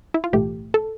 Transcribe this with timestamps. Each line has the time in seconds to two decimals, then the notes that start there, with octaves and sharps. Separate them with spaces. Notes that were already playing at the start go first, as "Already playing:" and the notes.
0.14 E4
0.24 F4
0.33 B1 A2 E3 A3 G4
0.74 A4